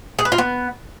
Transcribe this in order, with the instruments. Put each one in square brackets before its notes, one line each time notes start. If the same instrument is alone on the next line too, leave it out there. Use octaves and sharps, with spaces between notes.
[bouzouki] G#4
B4
F4
B3